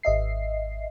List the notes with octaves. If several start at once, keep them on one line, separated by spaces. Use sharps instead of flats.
G#1 D#5 E5 C7